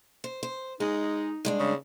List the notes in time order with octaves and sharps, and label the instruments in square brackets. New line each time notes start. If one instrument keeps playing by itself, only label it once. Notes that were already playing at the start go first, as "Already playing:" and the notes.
[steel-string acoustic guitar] C5
C5
[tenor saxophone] G#3 [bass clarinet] D#4 [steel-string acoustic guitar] G#4
[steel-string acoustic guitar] G2 G#3 D4
[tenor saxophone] C#3